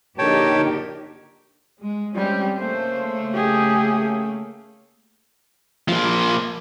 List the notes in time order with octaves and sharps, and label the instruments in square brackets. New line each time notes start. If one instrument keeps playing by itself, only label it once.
[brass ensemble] A#1 A#4 [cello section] D3 D#4 G4 [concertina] C#5 G5 A5
[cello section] G#3
[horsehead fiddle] G3 G4 [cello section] G#3 C4 C#4
[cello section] C#3 A3 A#3 [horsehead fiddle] C5
[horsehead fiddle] G4 G#4
[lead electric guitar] F3 A#3